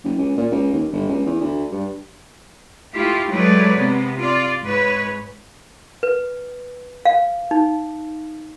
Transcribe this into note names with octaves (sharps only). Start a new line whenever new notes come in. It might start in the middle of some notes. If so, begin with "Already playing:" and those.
F#1
C#2
A#2
C#2
D#2
G1
C#2
E2
D2
G2
A3 E4 F4 G4
F#3 G#3 A3 B4 C#5 D5
C3 B3
F4 D5
G#2 G#3 B4 C#5
B4
F5
D#4